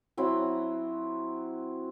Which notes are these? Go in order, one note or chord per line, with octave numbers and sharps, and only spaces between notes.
F#3 C4 E4 F#4